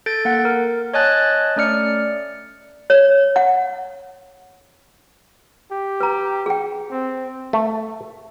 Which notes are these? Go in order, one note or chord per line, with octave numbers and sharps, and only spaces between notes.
A4 G6 A6 D7
A#3 F#5
A#4
C#5 D#5 G#5 A5 F#6 A6
A3 C#4 D5 F6 C#7
C#5
F#5
G4
B4 A#5
G#4 G5
C4
A3